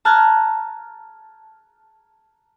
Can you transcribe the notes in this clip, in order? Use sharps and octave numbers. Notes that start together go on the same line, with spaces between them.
A5 A#5 F6 F#6 G#6 A6